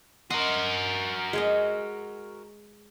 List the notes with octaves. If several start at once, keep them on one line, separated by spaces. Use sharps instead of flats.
F#4 A#4 D#5 C6
G#3 G#4 D#5